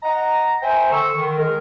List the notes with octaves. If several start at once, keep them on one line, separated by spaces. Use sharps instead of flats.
D#5 F#5 A#5
C5 E5 G5 G#5 A#5
D3 C#6 E6
D3 D#3
G#3 G#4 A#4